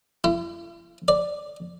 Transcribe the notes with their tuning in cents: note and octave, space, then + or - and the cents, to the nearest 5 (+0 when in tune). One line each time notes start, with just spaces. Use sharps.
E4 +45
D5 +5